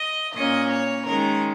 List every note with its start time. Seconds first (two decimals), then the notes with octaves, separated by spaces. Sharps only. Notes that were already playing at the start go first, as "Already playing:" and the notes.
Already playing: D#5
0.34 A#2 A#3 C#4 D#5
0.71 C#5
1.05 D#3 G#3 C#4 A#4